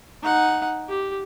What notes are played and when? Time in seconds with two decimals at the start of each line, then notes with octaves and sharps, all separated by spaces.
0.23 D#4 F#5
0.89 G4